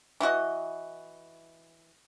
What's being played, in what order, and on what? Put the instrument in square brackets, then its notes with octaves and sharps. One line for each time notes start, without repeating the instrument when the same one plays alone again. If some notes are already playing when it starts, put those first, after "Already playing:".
[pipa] E3 E4 F#4 D#5